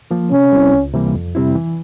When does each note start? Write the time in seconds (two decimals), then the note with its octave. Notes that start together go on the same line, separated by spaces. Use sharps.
0.11 F3 A#3
0.32 C3 C#4
0.52 G3 C4 E4
0.73 C#2
0.94 C3 E3 G3 A#3
1.14 F2
1.35 C3 G3 C4 E4
1.55 E3